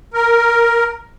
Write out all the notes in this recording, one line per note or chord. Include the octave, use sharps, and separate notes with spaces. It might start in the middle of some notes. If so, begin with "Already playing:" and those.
A#4